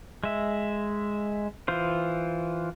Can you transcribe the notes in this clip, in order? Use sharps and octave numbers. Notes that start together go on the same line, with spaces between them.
G#3 E5
E3 F4 C5